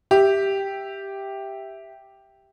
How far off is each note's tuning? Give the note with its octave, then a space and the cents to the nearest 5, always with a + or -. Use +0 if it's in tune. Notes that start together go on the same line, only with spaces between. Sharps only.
G4 +0 E5 +0